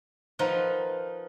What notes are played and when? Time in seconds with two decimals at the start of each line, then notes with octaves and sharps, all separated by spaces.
0.39 F3 D#4 F4 A#4 B4 F#5